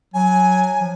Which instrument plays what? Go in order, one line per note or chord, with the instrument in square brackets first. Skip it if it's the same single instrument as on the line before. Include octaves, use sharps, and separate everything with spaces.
[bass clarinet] F#3 [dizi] G#5
[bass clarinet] F3